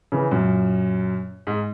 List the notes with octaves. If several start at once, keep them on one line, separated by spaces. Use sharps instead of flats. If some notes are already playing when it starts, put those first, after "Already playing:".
C#3 E3
F#2 A#2
G#2